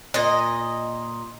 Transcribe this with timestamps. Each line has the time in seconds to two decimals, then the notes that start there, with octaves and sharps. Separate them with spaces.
0.14 A#2 D#5